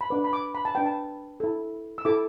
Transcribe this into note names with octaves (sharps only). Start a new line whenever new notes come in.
B5
D4 B4 D6
B5
D6
B5
A5
D4 B4 G5
A5
E4 A4
E6
E4 A4 D6